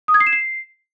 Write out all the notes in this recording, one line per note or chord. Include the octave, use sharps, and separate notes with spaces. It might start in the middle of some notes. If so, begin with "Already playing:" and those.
D#6
G#6
C7
E7
C7